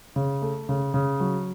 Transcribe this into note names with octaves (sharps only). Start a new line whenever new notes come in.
C#3
A3
C#3
C#3
F#3